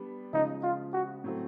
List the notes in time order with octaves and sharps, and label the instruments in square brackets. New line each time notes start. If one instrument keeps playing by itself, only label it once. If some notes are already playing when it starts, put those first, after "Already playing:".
Already playing: [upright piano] G3 B3 D4
[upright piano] C#3 F3 G#3 [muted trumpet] D#4
[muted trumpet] F4
F#4
[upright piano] A2 F#3 A3 C4